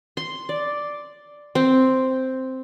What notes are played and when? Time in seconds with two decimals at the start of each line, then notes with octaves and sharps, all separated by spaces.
0.17 C6
0.49 D5
1.55 C4